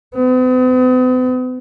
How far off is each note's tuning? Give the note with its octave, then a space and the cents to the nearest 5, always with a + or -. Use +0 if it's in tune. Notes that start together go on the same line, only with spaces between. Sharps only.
B3 +45